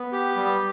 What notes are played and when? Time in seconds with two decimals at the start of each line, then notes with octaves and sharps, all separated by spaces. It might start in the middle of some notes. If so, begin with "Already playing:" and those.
Already playing: B3
0.12 G4
0.36 G3